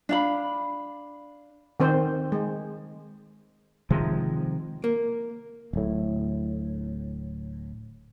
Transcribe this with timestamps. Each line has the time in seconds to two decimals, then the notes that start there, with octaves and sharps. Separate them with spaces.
0.09 D4 F5 B5
1.80 D#3 C4 C5
2.32 G#3
3.90 C3 D#3 F3 G#3
4.84 A#3
5.73 D1 A2